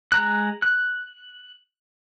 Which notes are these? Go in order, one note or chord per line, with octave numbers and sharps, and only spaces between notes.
G#3 A#5 F#6
F#6